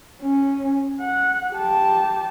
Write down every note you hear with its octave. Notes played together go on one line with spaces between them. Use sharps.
C#4
F#5
G4 A5